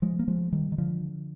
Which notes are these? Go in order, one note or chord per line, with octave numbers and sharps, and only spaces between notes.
F3 G#3
A#3
F3 G#3
D#3 G3
D#3
D3 F3